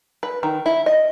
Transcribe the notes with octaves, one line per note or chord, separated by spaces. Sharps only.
B4
D#3
E4
D#5